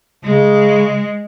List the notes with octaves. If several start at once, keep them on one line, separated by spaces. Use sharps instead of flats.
C#3 G#3